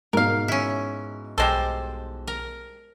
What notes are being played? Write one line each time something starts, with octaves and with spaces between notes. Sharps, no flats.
G#2 B2 A#4 F5
C#4 E4
B1 G3 G#3 A4 C5
A#4